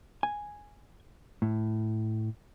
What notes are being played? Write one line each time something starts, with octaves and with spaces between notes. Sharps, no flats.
G#5
A2